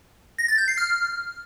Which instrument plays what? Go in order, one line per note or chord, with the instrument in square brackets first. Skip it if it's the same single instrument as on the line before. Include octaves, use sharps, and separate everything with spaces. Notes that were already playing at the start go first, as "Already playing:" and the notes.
[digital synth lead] A#6
A6
G6
C7
F6